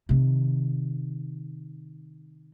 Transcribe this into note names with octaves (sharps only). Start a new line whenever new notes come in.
C3 D#3